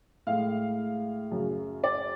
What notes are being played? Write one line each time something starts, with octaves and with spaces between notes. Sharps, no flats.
A2 G#3 F5
F#2 C#3 F#3
D5